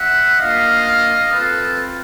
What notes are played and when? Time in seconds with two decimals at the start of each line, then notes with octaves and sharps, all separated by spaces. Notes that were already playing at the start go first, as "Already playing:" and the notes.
Already playing: E5 F#5
0.39 A#3 D4 F4 D#5 F5
1.31 C4 F4 A4 B4